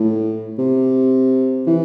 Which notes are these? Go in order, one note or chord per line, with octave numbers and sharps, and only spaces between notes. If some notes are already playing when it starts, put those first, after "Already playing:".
Already playing: A2
C3
E3